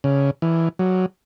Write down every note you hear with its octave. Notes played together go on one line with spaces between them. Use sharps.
C#3
E3
F#3